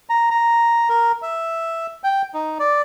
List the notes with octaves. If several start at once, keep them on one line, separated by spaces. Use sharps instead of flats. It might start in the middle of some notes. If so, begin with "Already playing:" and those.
A#5
A#5
A#4
E5
G5
D#4
D5